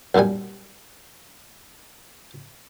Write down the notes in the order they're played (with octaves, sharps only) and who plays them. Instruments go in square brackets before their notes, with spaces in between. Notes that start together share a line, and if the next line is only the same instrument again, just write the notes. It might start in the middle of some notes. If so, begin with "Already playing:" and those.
[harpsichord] B1 F#2 A#2 G3 G#5